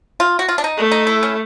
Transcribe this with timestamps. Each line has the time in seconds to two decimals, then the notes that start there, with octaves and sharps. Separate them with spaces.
0.20 F4
0.39 F#4
0.48 F4
0.58 D4
0.64 D#4
0.77 A3
0.91 D#4
1.07 E4
1.23 C#4